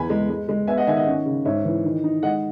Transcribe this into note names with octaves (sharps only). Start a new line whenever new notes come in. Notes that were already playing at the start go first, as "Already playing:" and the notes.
Already playing: E2 G#5 B5
G#3
G#3
G#3
B3 E5 G#5
D#5 F#5
D#3 E5 G#5
D#5 F#5
C#4
C#3
G#2 C#5 E5
E3
D#3
D#4
G#3 D#5 F#5